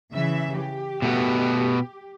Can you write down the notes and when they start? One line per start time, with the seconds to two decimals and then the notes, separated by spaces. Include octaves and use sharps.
0.13 C#3 E3 E5
0.57 G4
1.02 B2 A3 B3